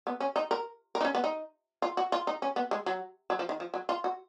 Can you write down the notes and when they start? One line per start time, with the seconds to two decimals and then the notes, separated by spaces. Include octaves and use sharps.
0.07 B3
0.20 C#4
0.36 D#4
0.51 A#4
0.95 A#4
1.01 D#4
1.05 C#4
1.15 B3
1.24 D#4
1.82 F4
1.97 F#4
2.12 F4
2.27 D#4
2.42 C#4
2.56 B3
2.71 G#3
2.86 F#3
3.30 F#3
3.39 F3
3.49 D#3
3.60 F3
3.74 F#3
3.89 F4
4.04 F#4